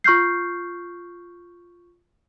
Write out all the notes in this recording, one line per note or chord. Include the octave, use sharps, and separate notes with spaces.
F4 C#6 F6 G6 C7